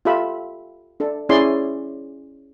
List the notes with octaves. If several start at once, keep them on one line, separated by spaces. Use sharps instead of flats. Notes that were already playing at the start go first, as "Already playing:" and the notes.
F4 G4 A4 E5 B5
D4 A4
C#4 E4 G#4 D5 C6